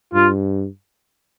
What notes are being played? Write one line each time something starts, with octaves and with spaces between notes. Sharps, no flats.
G2 F4